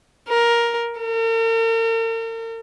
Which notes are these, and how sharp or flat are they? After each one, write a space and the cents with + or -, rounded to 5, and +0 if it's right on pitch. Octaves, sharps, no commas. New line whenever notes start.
A#4 +10
A#4 -45